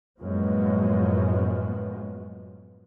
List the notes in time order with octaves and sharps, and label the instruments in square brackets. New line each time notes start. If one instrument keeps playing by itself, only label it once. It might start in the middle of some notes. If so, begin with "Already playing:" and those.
[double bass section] F#2 A2 F3 G#3 A#3 B3